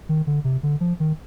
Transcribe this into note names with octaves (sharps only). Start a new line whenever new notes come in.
D#3
D3
C3
D3
F3
D#3